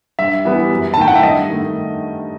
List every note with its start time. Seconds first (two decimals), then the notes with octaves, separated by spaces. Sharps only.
0.19 G2 E5
0.45 E3 G3 B3
0.71 F#2
0.94 A5
0.97 D#3 A3 E4 G5
1.08 F#5
1.15 E5
1.22 G2 D#5
1.49 D#3 A3